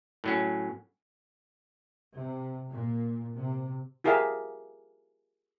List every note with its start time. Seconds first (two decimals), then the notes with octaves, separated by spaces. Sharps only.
0.24 A2 F#3 C#4
2.17 C3
2.70 A#2
3.34 C3
4.04 F4 G4 G#4 A#4 E5 F5